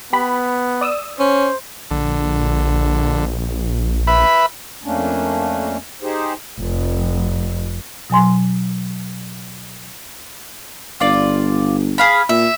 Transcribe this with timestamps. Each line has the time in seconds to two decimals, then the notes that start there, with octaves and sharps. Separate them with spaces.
0.13 B3 G4 B5
0.81 D5 D#6 E6
1.19 C#4 C5
1.91 A#1 D3
4.07 B4 E5 B5
4.84 F2 A3 A#3 C#4 D4
6.02 D#4 G4 G#4 C5
6.60 F1
8.10 B2 F#3 G#5 C6
11.00 G1 F4 D5
11.98 G#4 F5 B5
12.29 A#2 E5